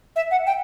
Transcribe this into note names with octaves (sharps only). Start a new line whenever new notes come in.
E5
F#5
G5